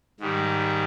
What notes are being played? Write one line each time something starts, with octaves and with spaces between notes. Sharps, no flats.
G#2 D#3 G3